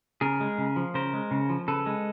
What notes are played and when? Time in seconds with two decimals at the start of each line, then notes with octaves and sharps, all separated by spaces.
0.21 C#3 G#4 A#4
0.40 G#3
0.58 C#3
0.76 F3
0.94 C#3 A#4 C5
1.13 G#3
1.31 C#3
1.50 F3
1.68 C#3 A4 B4
1.86 G#3